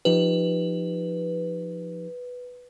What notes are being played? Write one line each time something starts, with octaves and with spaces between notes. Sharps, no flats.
F3 D#4 G4 B4